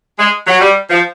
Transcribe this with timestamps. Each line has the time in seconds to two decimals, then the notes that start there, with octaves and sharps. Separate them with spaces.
0.19 G#3
0.47 F#3
0.61 G3
0.90 F3